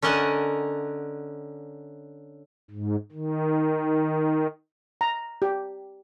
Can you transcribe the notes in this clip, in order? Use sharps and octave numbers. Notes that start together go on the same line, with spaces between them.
D3 C#4 A#4 D#5 F#5 A5
G#2
D#3
A#5
G4